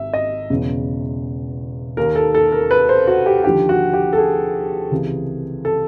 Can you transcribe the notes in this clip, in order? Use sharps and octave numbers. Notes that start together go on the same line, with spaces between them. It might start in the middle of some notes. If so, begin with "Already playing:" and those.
Already playing: G#1 E5
D#5
E1 E2 C#3
D#2 D#3 A#4
A4
A4
A#4
B4
C5
F#4
G4
D#2 D3 F3 G4
F#4
G4
A4
G#4
C#2 C3 E3
A4